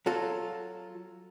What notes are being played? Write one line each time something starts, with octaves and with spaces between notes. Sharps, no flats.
F#3 F4 A4